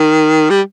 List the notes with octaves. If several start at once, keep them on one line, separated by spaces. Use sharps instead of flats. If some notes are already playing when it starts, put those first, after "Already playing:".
Already playing: D#3
G3